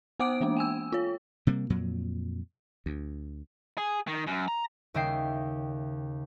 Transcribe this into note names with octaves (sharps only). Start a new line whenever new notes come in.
B3 C5 F#5 D6 D#6 D7
E3 G#3 A#3 D4
G5 G#5 E6
F4 C#5
C3 G3 A#3
F2 A#2 F#3
D2
G#4
D#3
F#2
A#5
D#2 C#3 D#5 E5 G5 C7